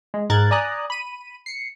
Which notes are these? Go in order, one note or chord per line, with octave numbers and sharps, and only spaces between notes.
G#3
G#2 A#4 F#6 G#6 A6
D5 G#5 A#5 D#6 F#6
B5 D#7
C7 C#7